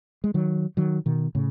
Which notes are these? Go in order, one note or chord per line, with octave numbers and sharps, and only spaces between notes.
G#3
D#3 F#3
D#3 F#3
B2 D#3
A2 C#3